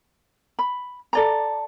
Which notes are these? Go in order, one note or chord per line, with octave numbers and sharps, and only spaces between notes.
B5
A4 D5 A#5